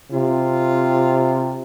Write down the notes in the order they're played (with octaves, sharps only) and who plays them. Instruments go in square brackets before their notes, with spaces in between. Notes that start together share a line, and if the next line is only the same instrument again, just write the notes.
[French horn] C3 [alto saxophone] F4